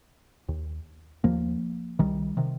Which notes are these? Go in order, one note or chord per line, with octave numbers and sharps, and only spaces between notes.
D#2
D#2 F3 A#3
C2 D#3 G3
C3 D#3